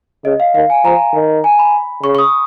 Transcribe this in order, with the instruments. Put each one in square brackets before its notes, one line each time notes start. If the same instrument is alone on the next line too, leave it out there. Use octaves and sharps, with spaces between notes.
[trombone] C#3 [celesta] D#5
[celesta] F5
[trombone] D#3 [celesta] F5
[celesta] G#5
[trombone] F3 [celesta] A#5
[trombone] D#3
[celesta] G#5
B5
[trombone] C#3 [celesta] C#6
[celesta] C#6
D#6